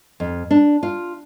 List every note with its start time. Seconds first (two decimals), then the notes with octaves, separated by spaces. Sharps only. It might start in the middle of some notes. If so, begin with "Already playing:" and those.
0.20 F2
0.51 D4
0.83 F4